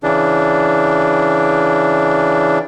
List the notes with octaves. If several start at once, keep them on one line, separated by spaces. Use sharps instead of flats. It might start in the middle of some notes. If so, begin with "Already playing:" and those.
C#3 E3 D4